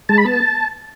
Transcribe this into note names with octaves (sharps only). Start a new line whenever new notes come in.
G#3 A5
B5
B3 A5